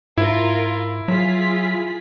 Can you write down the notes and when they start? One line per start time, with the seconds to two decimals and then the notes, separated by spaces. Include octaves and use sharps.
0.18 G#2 E4 F4 A#4
1.08 F#3 F4 G#4 B6